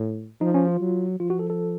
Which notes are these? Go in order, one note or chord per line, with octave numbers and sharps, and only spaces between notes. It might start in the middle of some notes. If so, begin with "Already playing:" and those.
Already playing: A2
F3 D#4
C#4
F4
F#3
F3 F4
F#4
A4
A4